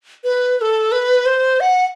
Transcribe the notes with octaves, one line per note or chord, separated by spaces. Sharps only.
B4
B4
A4
B4
C5
F#5